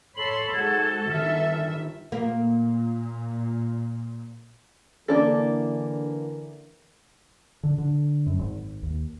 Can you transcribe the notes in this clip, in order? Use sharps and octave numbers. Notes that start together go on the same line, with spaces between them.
A4 C#5 B5 C6 F#7
G#2 G#3 F#4 G#6
G1 D#3 E5 F6
A#2 A#3
D3 E3 A#3 D4 A4 A#4
D3
D3
F#2
G#1
D#2